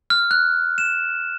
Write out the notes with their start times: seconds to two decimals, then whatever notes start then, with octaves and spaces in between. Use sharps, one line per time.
0.10 F6
0.31 F#6
0.78 E7